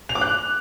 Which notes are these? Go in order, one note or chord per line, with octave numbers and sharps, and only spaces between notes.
F7
D6
F#6